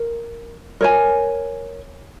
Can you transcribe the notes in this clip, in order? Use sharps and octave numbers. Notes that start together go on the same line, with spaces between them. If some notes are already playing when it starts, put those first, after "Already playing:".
Already playing: A#4
A#4 C#5 G#5